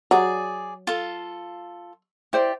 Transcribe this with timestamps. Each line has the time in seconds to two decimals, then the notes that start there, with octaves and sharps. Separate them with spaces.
0.11 F#3 G#4 D5
0.87 F4 A4
2.33 E4 G4 C5 D5